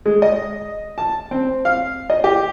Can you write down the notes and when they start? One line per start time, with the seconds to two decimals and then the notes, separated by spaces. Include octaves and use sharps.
0.06 G#3
0.22 D#5
0.98 A5
1.31 C4
1.65 F5
2.10 D#5
2.24 G4